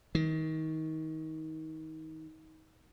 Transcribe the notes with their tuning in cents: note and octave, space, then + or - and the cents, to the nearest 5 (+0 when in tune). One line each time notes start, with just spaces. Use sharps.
D#3 +25